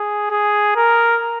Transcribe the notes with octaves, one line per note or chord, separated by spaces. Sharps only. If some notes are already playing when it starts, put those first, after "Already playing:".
Already playing: G#4
G#4
A#4